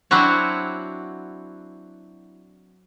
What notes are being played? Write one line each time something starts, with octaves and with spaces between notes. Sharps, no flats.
F#3 C4 D4 E4 F#4 C#5